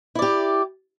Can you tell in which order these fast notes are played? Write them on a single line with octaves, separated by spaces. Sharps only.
E4 D5 G4